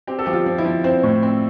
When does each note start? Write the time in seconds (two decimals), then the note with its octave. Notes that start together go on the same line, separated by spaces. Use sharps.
0.07 C4 G4
0.19 A4
0.26 F3 G4
0.33 F4
0.46 F3
0.58 E4
0.65 F3
0.84 C4 C5
1.03 A2
1.23 C4